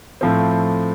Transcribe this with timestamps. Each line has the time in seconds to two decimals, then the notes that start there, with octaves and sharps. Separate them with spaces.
0.21 A2 F3 A3 C4